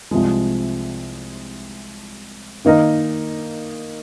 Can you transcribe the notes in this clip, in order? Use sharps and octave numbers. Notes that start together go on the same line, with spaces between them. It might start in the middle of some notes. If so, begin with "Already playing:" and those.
C2 C3 F3 G#3
D#3 A#3 D#4 A#4 D#5